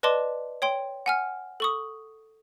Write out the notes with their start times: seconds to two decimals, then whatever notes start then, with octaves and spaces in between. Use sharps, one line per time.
0.03 B4 D5 D#5 A5 C6 D6
0.62 C#5 G5 C6
1.06 F#5 G#5 F6
1.60 A4 C#6 D#6